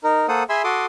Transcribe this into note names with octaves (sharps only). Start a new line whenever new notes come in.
D#4 A#4
A#3 A4 C5 F#5 D#6
G#4 E5 G#5 B5 C6 E6
F#4 A4 C6 D6 D#6